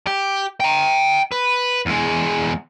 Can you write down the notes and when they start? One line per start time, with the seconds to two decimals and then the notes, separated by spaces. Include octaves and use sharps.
0.07 G4
0.60 G5 A#5
1.32 B4
1.86 E2 G#3